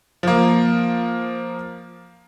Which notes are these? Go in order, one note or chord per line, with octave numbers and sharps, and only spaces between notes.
F3 A#3